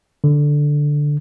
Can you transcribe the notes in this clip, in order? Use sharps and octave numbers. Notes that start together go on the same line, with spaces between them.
D3